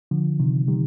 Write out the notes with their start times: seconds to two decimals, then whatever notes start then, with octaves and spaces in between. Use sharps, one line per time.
0.11 D3 F3
0.40 C3 D#3
0.68 D#3 G3